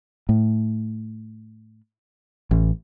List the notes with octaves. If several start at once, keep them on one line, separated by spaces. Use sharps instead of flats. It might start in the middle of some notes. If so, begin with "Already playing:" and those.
A2
A1